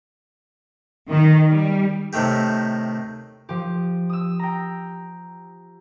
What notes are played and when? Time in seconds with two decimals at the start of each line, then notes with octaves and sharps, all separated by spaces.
1.08 D#3
1.48 G3
2.13 A2 C3 D#3 A3 G4
3.49 F3 G4
4.10 D#6 E6
4.39 G5 A#5